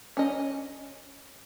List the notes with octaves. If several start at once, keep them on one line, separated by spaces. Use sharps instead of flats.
C#4 D#5